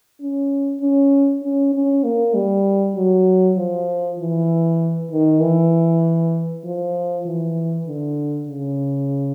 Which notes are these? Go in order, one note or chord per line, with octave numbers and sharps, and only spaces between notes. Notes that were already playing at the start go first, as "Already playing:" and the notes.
C#4
C#4
C#4
C#4
A#3
G3
F#3
F3
E3
D#3
E3
F3
E3
D3
C#3